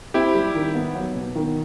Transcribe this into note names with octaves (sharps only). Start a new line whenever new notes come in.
C4 E4 G4
G3
D#3
B3
F#3
B2
D#3